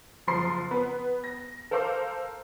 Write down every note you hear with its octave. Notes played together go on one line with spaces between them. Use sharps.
F#1 F3 A#5 C6 C7
B3
A#6
A4 A#4 C5 F5 D6 E6